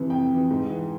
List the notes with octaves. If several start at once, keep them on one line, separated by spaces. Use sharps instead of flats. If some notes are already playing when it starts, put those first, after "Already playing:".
Already playing: F2 C3 E3
F2 G5
C3 E3
G#2
E3